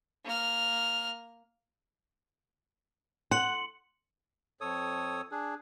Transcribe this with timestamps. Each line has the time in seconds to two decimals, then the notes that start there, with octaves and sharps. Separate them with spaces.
0.25 A#3 F6
3.31 F#5 C6 C#7 F#7
4.61 F2 A4 C#5 D#6
5.31 D4 G#4